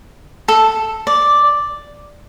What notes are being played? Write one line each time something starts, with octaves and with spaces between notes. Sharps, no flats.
A4
D5